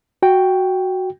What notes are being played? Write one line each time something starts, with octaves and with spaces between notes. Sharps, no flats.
F#4 G5